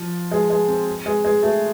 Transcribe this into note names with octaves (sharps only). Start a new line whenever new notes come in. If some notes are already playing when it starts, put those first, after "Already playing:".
Already playing: F3
G#3
G#3
C4
G#3
G#3
A3